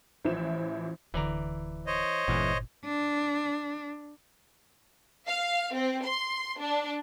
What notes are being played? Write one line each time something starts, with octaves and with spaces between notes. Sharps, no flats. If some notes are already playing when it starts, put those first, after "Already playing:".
A1 E3 F3 E4 C5 E7
D1 D3 E3 D5 A#5
C5 C#5 D#5
G1 E2 A#2 E3 G#3
D4
F5
C4
C6
D4